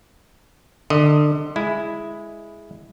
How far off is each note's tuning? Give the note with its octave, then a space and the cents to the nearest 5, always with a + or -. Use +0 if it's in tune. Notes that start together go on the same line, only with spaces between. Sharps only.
D3 +25 D#5 +10
G#3 +0 E4 +0